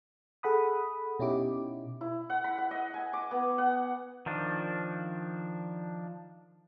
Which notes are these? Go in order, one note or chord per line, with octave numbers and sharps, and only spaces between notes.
G#4 A4 F#5 B5 D#6
B2 C#4 D#4 E4 G4 D6
E4
F#5
B5
F#5
D#5
G#5
D6
B3
F#5
D#3 F3 D4